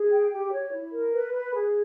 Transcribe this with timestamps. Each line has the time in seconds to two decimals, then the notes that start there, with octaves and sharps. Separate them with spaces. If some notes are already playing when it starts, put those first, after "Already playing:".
Already playing: G#4
0.11 G5
0.31 G4
0.51 C#5
0.72 E4
0.92 A#4
1.12 B4
1.33 B4
1.53 G#4